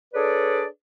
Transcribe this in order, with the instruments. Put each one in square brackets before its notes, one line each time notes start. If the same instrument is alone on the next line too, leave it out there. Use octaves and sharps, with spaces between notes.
[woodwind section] D4 G#4 A4 B4 C#5 D5